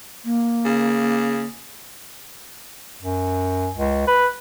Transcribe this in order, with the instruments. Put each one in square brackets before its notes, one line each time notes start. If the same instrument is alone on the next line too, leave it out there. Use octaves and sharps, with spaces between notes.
[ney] A#3
[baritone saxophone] C#3
[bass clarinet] F#2
C#2
B4